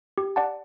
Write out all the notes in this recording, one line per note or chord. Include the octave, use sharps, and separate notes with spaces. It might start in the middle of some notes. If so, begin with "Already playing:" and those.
G4
D5 F#5 A5